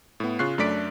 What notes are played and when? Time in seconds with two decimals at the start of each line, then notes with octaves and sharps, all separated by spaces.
0.20 A2 B3
0.39 C#3 F4 C#6 F#6 C7
0.58 F#2 A3 D4 D5 B6 D7